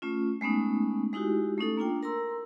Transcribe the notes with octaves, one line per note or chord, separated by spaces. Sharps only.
A3 C#4 F4
G#3 A3 B3 C#4 D#4
G#3 D#4 E4 F#4 G4
A3 C#4 D#4 A4
A#3 D4 F4 G5
A#4 A#5 C6 E6